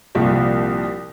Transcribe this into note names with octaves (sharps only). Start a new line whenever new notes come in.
C2 A#2 F3 G3